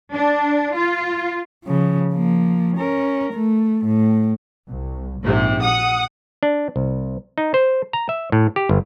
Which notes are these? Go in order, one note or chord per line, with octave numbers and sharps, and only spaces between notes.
D4
F4
C#3 F3
F3 A#3
C#4 A#4
A3
A2
C2
A#1 G#2 C3
F#5 D#6
D4
C2
D#4
C5
A#5
E5
A2
G4
G1